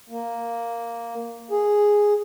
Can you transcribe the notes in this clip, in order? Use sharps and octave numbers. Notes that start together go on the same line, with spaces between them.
A#3
G#4